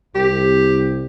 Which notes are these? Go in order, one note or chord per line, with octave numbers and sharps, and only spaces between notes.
C2 G4